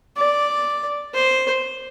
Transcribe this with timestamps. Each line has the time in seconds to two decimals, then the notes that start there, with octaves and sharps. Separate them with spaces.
0.17 D5
1.14 C5